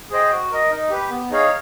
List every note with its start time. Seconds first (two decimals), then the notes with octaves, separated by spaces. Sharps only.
0.10 G#4 C5 D#5 G5
0.31 F#4
0.51 A#4 D#5
0.70 D#4
0.90 G4 B4
1.10 B3
1.31 D#4 G#4 C#5 F5